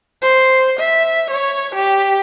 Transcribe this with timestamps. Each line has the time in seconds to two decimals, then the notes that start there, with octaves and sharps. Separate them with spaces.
0.22 C5
0.79 E5
1.31 C#5
1.75 G4